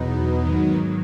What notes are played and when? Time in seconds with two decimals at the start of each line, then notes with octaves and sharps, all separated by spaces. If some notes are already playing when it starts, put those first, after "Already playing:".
Already playing: E2 B2 F#3 B3 D#4
0.45 G#2 D#3 F#3